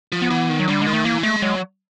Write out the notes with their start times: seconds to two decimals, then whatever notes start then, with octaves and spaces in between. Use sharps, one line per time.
0.12 F3
0.22 B3
0.30 E3
0.50 D#3
0.60 F#3
0.68 D3 G3
0.82 D#3 G#3
0.93 A3
1.05 E3 A#3
1.23 G#3 A3
1.42 F#3 G#3